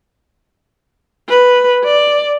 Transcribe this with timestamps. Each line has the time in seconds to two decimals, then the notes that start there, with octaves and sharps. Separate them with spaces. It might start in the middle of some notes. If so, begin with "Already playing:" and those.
1.29 B4
1.84 D5